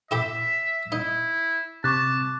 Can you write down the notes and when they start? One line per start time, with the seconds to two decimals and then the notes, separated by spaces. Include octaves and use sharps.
0.11 E4 G4 E5 C6 E7
0.92 D#4 E4
1.84 C3 A5 C#6 D6 F#6